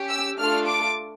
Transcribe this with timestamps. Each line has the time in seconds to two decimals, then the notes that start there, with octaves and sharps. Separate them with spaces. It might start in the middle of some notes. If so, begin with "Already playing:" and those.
Already playing: C#4 G4
0.10 E6
0.38 A3 D4 F4 A4 F6
0.66 D6